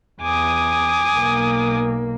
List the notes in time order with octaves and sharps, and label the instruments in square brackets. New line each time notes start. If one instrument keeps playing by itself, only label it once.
[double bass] E2 [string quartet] G#5 D6 D#6
[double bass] B1 A#3